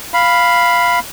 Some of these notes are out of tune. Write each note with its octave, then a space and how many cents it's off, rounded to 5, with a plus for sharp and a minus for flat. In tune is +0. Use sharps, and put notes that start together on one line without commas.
F5 +0 B5 +0